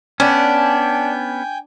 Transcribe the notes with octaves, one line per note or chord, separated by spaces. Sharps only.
B3 C#4 D4 G5 G#5 G6